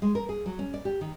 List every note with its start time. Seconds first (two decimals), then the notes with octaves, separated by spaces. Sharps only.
0.02 G#3
0.15 A#4
0.29 G#4
0.46 F#3
0.59 C#4
0.74 D5
0.85 G4
1.01 D#3